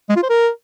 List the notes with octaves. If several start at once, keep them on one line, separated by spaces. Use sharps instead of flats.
G#3
F4
C5
A#4